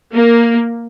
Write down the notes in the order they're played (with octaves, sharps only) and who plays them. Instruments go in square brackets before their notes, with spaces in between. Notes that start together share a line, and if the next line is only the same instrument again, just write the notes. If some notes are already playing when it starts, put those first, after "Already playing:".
[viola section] A#3